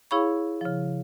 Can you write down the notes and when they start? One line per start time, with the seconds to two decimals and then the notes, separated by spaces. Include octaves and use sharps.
0.11 E4 G#4 C#5 F5 B5 C#6
0.61 C#3 F3